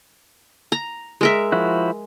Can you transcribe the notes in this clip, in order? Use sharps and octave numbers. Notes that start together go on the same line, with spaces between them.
A#5
G#3 A#4 E5
F3 E4 F#4